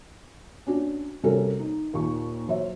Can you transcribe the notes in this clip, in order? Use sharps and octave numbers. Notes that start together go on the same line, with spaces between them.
C#4 D4 F#4
C3 G3 C#4 F#4 A4 A#4
D#4
D#2 A#2 C#6
F#3 C5 C#5 E5